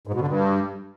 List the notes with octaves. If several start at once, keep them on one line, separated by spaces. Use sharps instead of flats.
G#2
B2
D3
G2